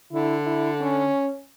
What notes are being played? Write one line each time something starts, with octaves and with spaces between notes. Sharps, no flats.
D3 E4
E4
C#4